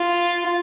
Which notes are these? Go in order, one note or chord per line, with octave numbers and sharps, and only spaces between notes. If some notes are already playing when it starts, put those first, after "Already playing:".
Already playing: F4